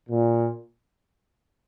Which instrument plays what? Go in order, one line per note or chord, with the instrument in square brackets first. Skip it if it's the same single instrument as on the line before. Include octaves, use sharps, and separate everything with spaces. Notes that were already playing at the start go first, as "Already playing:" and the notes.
[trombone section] A#2